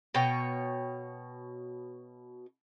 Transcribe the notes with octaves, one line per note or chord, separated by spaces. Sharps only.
B2 C#5 G5